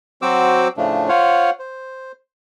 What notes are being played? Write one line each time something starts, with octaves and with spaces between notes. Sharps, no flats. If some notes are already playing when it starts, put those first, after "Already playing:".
F#3 C4 F#4 C5 D6 E6
A2 C#3 F3 A3 D4
F4 C5 C#5 F5 F#5
C5